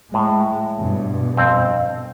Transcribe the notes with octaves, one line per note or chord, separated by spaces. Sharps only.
A2 G#3
G2 B2
F2 C4